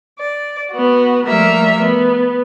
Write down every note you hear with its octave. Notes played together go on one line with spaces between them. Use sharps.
D5
B3 F#4
F3 G3 A3 A#3 A#4 E5
B3